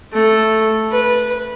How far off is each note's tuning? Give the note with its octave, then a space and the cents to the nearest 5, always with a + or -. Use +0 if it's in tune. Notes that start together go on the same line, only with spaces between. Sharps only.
A3 +0
B4 -15